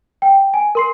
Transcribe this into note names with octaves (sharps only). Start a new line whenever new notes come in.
G5
G#5
A#4 C6 C7